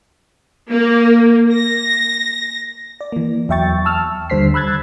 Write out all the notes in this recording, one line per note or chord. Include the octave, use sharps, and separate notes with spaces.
A#3
A#6
D5
E3 A#3
E2 F#3 E5 G5 C#6 A6
A5 E6 F6
D#2 D3 G3 C5 B6 C7
B5 E6 F#6 G#6 A6